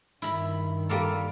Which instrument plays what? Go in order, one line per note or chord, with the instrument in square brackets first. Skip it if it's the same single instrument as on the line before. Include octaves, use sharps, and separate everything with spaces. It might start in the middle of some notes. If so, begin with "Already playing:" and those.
[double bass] G2 D#3 [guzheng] E4 B5
[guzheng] G3 A#3 A4